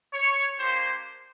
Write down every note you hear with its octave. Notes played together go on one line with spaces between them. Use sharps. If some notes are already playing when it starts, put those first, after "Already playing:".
C#5
A#3 D4 G4 C5